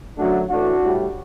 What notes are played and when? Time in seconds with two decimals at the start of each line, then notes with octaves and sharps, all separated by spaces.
0.18 F#2 D3 F#3 A3 D4 F#4
0.49 A2 E3 A3 D4 F#4
0.80 A2 G3